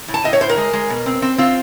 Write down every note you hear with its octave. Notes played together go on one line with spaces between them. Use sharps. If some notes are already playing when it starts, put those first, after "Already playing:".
A2
A5
A2 D#5
C#5
A2 C5
A#4
G#3
G#3
B2
C4
C4
C4 F4